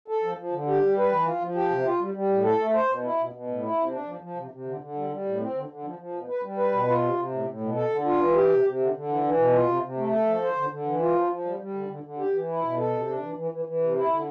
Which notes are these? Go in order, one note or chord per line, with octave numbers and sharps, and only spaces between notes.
A4
F3
F3
D3
G4
G3
B4
E3
F4
F3
G4
C3
F4
G3
G3
A2
A4
A3
C5
B2
E4
B2
B2
A2
E4
C3
D4
F3
F3
C3
C3
D3
D3
G3
G3
A2
C4
D3
D3
F3
F3
B2
B4
G3
B4
B2
F4
C3
C3
A2
A2
B2
A4
D3
F4
E3
G4
C3
C3
D3
D3
E3
E3
B2
F4
C3
C3
A3
A4
F3
C5
D3
D3
E3
F4
F3
F3
G3
G3
D3
D3
D3
G4
E3
E4
B2
A4
C3
D4
E3
E3
E3
E3
C3
E4
D3